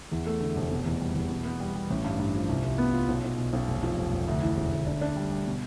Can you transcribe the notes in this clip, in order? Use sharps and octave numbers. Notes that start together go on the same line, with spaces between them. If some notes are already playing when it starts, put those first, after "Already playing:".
E2
A3
D3
F1
B2
E2
G3
E2
B2
B3
G3
G3
A1
G2
G2
F3
C2
C2
B3
F4
B1
B1
B2
B1
F1
F3
F1
F1
D2
E3
E1
D2
D4
D4
G3
G3
B2